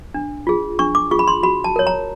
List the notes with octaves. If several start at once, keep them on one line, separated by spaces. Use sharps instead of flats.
D4
F4 G#4
D4 C#6
D6
F4 G#4 C#6
B5
C6
F#4 B5
A5
A#4 C#5
A#5